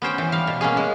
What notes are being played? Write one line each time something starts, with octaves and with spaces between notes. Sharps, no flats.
B3 C#4 C5 G5
E3
G3 F5
B2
A#3 B3 C#4 G#4
G#3